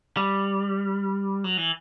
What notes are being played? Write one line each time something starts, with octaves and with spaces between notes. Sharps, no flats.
G3
F#3
E3